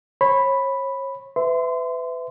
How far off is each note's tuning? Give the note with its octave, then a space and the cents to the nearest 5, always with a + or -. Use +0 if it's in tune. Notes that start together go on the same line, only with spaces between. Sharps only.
C#5 -35 B5 +0
B4 +35 E5 +0 C6 -30